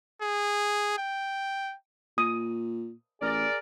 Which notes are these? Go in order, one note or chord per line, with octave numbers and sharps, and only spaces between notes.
G#4
G5
A#2 D#6
A1 G#4 A#4 D5